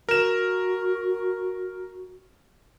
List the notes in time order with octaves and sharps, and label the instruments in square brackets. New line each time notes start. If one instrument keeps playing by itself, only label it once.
[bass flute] F#4 [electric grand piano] A#4 E7